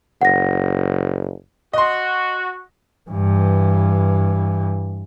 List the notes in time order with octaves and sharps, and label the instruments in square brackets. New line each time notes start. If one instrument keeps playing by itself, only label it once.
[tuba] F#1 [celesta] F#5 A#6
[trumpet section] F#4 [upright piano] D#5 C6
[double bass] G2 E3